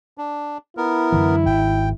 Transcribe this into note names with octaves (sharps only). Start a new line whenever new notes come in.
D4
B3 E4 A#4
F#2 D3 E3
G#1 G5